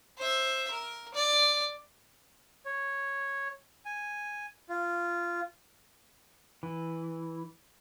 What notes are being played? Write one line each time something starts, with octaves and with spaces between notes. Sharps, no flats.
C5 E5
A#4
D5
C#5
G#5
F4
E3